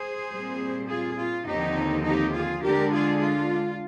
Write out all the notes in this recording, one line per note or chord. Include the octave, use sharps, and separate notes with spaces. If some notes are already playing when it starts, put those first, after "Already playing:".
Already playing: G#4 C5
A#2 G3 C4
F4 G#4
F4
D#2 D3 F3 C4 D#4 G4
D#4 G4
F4 G#4
D3 G#3 D4 G4 A#4
F4 G#4
F4